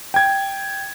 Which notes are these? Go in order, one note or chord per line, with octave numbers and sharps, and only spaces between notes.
G5 G#6